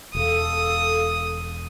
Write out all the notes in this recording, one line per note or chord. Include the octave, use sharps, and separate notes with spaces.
E1 A4 F5 D#6